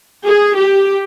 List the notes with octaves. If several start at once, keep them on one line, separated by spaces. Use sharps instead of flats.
G#4
G4